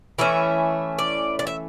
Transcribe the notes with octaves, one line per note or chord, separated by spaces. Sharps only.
E3 A3 C#4 E5
D5
D5
E5